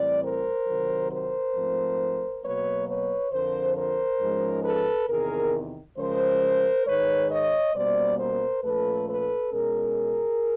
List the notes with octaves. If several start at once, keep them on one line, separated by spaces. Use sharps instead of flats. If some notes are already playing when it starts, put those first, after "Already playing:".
Already playing: A2 E3 G3 C4 D5
A#4 C5
C3 D#3 F#3
A#4 C5
G#2 F3 A3 C4
B2 F#3 A#3 B4 C#5
B4 C#5
F2 D3 F3 A#4 C5
A#4 C5
G#2 F3 G#3 C#4
A4 B4
E2 C3 D#3 G#4 A#4
C#3 F3 G#3 A#4 C5
G#2 D#3 G#3 B4 C#5
C#5 D#5
B2 G3 A#3 C#4 C5 D5
A#4 C5
A#2 F3 A3 C#4 A4 B4
A4 B4
B2 G#3 C#4 G#4 A#4